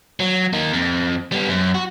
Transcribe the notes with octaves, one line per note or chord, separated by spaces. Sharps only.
F#3
A#3 D#4
F2
G3 B3
F#2
F#4